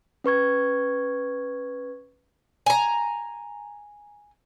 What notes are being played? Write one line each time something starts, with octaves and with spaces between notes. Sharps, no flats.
C#4 B4 C#6 G#6
G#5 A#5